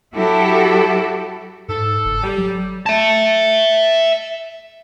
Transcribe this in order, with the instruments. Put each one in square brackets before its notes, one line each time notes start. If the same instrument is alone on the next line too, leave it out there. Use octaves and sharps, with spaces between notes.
[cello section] F#3 E4 F#4 G4 A4
[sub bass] G#2 [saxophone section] A4
[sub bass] F#1
[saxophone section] G3
[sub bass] F#3
[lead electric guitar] E5 A5